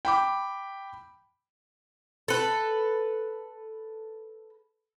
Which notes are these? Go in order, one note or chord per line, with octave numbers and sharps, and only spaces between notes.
G5 B5 D6
A4 B4